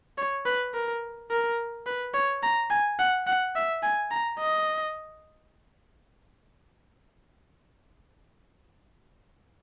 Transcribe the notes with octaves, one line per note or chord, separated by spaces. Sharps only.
C#5
B4
A#4
A#4
B4
C#5
A#5
G#5
F#5
F#5
E5
G#5
A#5
D#5